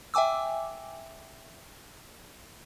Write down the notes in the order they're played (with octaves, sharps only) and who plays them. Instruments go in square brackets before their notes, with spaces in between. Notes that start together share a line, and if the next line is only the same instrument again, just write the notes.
[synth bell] E5 G5 G#5 D6 E6